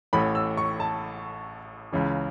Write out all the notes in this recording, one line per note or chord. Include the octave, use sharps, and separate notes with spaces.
A1 A2 E3 B5
E6
C#6
A5
C#2 C#3 E3